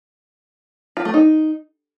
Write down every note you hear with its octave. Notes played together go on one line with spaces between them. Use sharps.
F4
A3
D#4